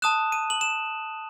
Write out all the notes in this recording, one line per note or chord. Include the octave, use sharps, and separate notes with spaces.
A5 D#6 F#6 E7
D#7
F#7
E7